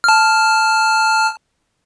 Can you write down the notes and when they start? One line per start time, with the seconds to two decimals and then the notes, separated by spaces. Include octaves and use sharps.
0.04 A5 F6